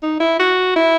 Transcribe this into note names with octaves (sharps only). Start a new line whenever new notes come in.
D#4
E4
F#4
E4